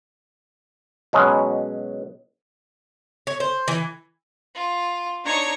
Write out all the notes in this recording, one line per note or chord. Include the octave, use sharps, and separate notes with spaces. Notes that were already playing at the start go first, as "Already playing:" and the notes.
B2 F#3 G#3 C#4
C#5
C5
E3
F4
D4 D#4 C#5 A#5 C#6